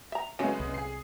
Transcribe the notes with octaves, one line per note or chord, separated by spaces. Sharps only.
E5 A#5
C#3 F#3 G#3 A3 B3 C#4
C2
G#4 C7